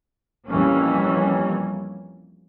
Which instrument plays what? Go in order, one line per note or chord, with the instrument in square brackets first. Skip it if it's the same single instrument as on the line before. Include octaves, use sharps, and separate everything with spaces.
[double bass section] F2 E3 G3 A#3 C#4